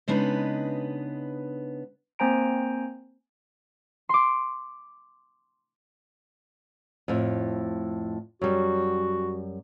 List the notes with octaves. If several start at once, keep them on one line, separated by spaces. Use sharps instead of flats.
C#3 G#3 B3 D4 D#4 B4
A#3 C4 C5 G#5 A#5 D7
C6 D6
F2 A2
F#2 G3 F#4